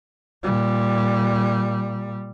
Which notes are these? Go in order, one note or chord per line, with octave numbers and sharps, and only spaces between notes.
A#2 G3